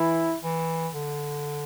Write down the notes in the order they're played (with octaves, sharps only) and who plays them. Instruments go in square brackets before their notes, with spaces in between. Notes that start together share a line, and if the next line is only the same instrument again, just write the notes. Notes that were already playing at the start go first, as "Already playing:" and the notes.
Already playing: [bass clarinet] E3 [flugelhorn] E4
[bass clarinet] E3
D3